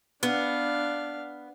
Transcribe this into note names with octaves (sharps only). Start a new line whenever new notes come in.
B3 D4 F5